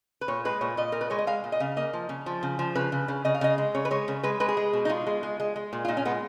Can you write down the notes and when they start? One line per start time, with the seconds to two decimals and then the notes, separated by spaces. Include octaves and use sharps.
0.21 B4
0.28 A#2 C#5
0.45 G#3 B4
0.61 A#2 C#5
0.77 A#2 D#5
0.92 A#2 A#4
1.01 B4
1.10 G#3 C#5
1.19 D#5
1.27 G#3 F5
1.44 A#2
1.52 D#5
1.60 C#3 F5
1.77 A#3 D#5
1.93 F3
2.09 C#3
2.26 F3
2.43 C#3
2.59 F3
2.75 C#3 B4
2.92 C#3
3.08 C#3
3.25 C#3 D#5
3.35 F5
3.41 C#3 D#5
3.58 G#3
3.75 C#3 C#5
3.85 B4
3.91 G#3 C#5
4.08 C#3
4.23 G#3 B4
4.40 G#3 B4
4.49 G#4
4.57 G#3
4.73 B2
4.85 D#4
4.89 G#3 F4
5.07 G#3
5.23 G#3
5.40 G#3
5.56 G#3
5.73 A#2
5.85 F4
5.88 A#2 D#4
5.97 C#4
6.05 G#3 B3